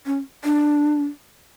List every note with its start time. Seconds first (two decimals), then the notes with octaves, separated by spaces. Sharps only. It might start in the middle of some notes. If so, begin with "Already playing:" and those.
0.06 C#4
0.45 D4